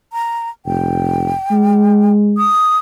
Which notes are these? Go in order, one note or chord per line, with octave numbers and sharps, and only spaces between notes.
A#5
F1 G5
G#3
D#6